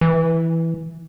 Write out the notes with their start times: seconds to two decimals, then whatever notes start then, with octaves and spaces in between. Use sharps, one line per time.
0.01 E3